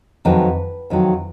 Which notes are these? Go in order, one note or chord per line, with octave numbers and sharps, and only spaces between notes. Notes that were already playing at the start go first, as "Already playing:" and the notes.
F2 D#3 F#3 B4
F2 D#3 F#3